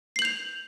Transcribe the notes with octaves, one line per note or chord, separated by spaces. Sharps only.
G6 C7 F7 F#7